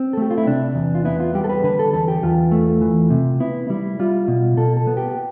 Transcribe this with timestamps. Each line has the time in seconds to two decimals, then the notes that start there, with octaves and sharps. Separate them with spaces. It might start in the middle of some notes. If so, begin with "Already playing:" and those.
Already playing: C4
0.13 A4
0.17 A3 G4
0.30 F4
0.38 E4
0.47 C3 D4
0.75 E2
0.95 F4
1.05 B3 E4
1.20 F4
1.34 G3 G4
1.44 A4
1.49 B4
1.63 D3 B4
1.79 A4
1.93 E2 A4
2.08 G4
2.23 E2 F4
2.52 A3
2.81 E3
3.10 C3
3.40 B3 E4
3.70 G3 E4
3.99 G3 F4
4.28 B2
4.57 B2 A4
4.77 A4
4.87 B3
4.97 G4